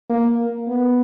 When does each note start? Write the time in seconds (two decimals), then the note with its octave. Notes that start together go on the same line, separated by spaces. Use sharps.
0.09 A#3
0.68 B3